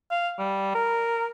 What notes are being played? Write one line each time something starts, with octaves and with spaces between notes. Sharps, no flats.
F5
G3
A#4